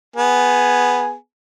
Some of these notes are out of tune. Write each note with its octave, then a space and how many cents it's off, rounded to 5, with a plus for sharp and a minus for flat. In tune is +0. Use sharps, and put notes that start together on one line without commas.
B3 +0 G#4 +0 G#5 +0